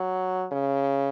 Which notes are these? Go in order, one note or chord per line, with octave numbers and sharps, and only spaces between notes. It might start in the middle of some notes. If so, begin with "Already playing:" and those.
Already playing: F#3
C#3